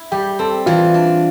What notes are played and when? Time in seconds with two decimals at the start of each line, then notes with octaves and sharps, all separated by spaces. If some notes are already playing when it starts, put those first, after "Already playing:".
Already playing: E4
0.12 G3 G4
0.39 C4 A4
0.66 E3 F4
0.94 D4